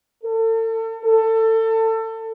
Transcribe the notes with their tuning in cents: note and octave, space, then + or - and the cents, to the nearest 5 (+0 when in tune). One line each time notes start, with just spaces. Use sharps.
A4 +35
A4 +25